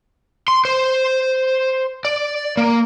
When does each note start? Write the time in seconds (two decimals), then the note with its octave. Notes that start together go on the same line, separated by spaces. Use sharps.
0.48 C6
0.65 C5
2.05 D5
2.57 A#3